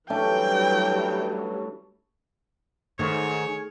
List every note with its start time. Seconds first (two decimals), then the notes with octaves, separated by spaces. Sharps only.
0.10 E3 F#3 G3 A3 C#4 D4 G5
2.99 G#2 D#3 A3 C#5 C#6 F6